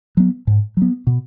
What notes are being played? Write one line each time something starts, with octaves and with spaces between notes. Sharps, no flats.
F#3 B3
G#2
F#3 B3
B2